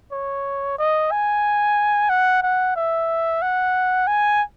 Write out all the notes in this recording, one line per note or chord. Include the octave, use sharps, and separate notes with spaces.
C#5
D#5
G#5
F#5
F#5
E5
F#5
G#5